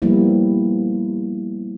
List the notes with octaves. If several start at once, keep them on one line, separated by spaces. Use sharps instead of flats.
F3 G3 A#3 B3 E4